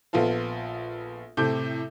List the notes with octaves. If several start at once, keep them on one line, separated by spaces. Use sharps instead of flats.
A#1 B3 F4 A4
A2 C3 A4 D6 G6